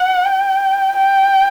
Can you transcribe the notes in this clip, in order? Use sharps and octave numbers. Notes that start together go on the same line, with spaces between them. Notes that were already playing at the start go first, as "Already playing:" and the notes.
Already playing: F#5
G5
G5